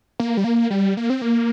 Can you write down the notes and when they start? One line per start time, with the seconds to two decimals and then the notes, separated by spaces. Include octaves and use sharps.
0.20 A#3
0.37 G3
0.44 A#3
0.70 G3
0.97 A#3
1.10 C4
1.22 A#3